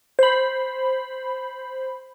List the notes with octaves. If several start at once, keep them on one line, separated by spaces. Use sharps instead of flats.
C5 B5